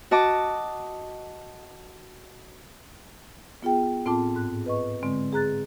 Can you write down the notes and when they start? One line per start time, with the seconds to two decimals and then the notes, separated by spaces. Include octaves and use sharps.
0.11 F#4 D#5 A5 D6
3.63 B3 F4 G#4 G5
4.06 A2 C4 F4 A5 D6
4.35 G#2 F#6
4.66 B4 D#5 C#6
5.03 D3 G#3 C4
5.33 G#4 A#5 F#6 A6